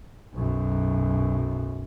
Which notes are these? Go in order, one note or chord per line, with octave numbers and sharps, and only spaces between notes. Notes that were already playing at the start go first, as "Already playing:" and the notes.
B1 F#2